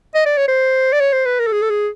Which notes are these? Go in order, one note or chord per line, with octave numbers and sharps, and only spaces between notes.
D#5
D5
C#5
C5
D5
C#5
C5
B4
A#4
A4
G#4
A4
G#4